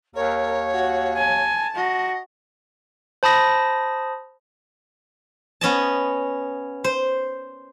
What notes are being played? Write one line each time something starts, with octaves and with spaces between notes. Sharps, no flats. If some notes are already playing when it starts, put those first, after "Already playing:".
D#2 A#4 C#5
F#4
G#5 A5
F#4 D#5
C5 A5 B5 D#6 A#6
B3 C#4 D#5 A5
C5